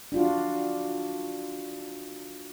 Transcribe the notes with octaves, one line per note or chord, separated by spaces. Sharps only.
D4 F4 F#4